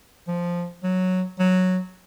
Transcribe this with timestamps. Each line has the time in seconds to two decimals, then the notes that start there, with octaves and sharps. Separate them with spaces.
0.28 F3
0.83 F#3
1.39 F#3